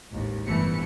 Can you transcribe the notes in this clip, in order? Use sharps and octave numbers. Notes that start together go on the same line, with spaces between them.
A1 D#2 G#2
G1 C2 E3 A3 C#7